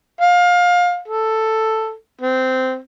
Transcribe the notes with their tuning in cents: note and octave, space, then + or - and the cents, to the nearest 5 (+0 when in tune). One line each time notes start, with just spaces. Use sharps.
F5 +25
A4 +5
C4 -15